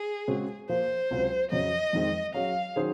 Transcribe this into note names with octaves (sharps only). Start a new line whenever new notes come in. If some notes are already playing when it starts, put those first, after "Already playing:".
Already playing: G#4
C#3 G#3 C4 F#4
F3 A#3 F4 C5
C#2 C3 F#3 C4 F4
F2 C#3 F#3 D#5
F2 D#3 G#3 C4
F#3 C#4 G#4 F5
D#3 F#3 C#4 G#4 C5